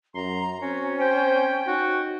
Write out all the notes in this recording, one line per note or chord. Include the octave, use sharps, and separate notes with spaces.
F#2 A#5 C6
C4 C#4 F#4
C5 G5
D#4 F#4